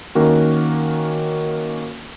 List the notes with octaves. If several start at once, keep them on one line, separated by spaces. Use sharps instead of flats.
D#3 A#3 C#4 F#4 A#4